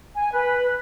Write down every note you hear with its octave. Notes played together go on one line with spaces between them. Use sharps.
G#5
B4